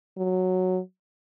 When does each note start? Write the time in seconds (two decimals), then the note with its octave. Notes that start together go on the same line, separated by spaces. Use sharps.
0.17 F#3